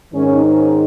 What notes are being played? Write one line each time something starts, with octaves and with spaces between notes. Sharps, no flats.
G#2 D#3 C#4
C#4